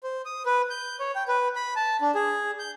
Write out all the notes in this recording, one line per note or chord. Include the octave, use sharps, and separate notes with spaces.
C5
D#6
B4
G6
C#5
G5
B4
B5
A5
D4
G#4
G6